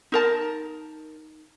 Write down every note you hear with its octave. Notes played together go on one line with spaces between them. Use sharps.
D#4 A#4 A5